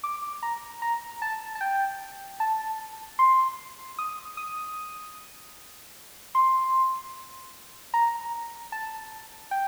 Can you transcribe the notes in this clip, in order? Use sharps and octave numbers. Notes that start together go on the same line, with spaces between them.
D6
A#5
A#5
A5
A5
G5
A5
C6
D#6
D#6
C6
A#5
A5
G5